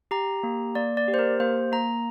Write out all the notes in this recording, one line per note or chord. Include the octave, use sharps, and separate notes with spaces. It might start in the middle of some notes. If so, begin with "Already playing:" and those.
G4 A#5
A#3
A#3 D5
D5
G4
C5
A#4
A#3 C5
A#3 A#5